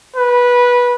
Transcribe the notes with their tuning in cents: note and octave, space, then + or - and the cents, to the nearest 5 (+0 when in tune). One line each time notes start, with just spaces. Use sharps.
B4 -15